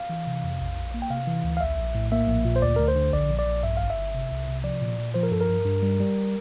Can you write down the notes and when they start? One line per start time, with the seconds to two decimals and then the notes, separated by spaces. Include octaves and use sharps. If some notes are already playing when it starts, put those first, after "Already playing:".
Already playing: F5
0.10 E3
0.27 C3
0.44 F2
0.60 A#1
0.77 A#1
0.94 A#3
1.02 G5
1.10 C3 F5
1.27 E3
1.44 D2
1.57 F5
1.61 A#1 E5
1.79 A#1
1.95 A2
2.12 A#3 E5
2.29 A#1
2.45 A#2
2.56 C5
2.62 D2 D5
2.76 D2 A#4
2.88 C5
2.96 D3
3.12 A#1 D5
3.30 A#1
3.39 D5
3.46 A#1
3.63 G2 E5
3.77 G1 F5
3.90 E5
3.98 G1
4.14 C3
4.31 C2
4.48 C3
4.64 F3 D5
4.82 A#2
4.98 A#2
5.14 F3 C5
5.23 A#4
5.31 G2 A4
5.41 A#4
5.49 G2
5.65 G2
5.83 G3
6.00 G3